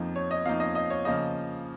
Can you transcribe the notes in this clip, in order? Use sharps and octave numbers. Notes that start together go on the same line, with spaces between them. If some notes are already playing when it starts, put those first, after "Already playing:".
Already playing: F2 F3 A#3 D#4
C#5
D#5
F2 F3 A#3 D#4 F5
D#5
D#5
C#5
C#3 F3 A#3 C#4 D#5